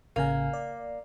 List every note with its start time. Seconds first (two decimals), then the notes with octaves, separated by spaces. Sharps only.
0.16 A1 C#3 A#3 G#5
0.53 D5